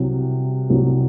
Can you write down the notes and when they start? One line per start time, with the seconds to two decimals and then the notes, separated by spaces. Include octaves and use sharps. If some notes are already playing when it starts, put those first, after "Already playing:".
Already playing: C2 C3 F#3
0.70 C2 C3 F#3